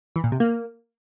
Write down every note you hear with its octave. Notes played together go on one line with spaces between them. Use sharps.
E3
A#2
C3
A#3